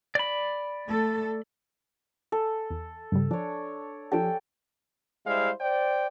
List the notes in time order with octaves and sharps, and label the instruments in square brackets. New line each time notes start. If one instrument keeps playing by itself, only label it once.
[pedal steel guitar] D5 B5
[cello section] A3 A4
[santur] A4
[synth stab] E2
G2 C#3 G3
[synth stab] F3 [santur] D4 C#5
[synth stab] F3 D4 G4 [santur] A4 G5
[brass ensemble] G3 G#3 E4 C5 E5 F5
C5 D5 G5